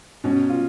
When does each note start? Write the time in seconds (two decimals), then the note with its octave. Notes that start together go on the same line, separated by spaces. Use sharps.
0.24 B2 C#4
0.50 F4